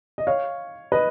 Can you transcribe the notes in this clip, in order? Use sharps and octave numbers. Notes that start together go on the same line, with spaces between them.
D#5
C#5 F5
B4 D#5